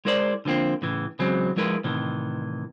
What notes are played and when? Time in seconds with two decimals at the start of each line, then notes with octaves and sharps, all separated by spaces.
0.05 G#3 E4 A#4 C5 D5
0.45 D3 F3 A#3 C4
0.82 A2 C#3 E3
1.19 C#3 E3 F#3 G#3 C4
1.56 F3 G#3 E4 A#4 B4
1.84 A2 C3 D#3 E3